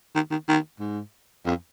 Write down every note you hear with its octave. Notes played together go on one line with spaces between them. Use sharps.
D#3
D#3
D#3
G#2
F2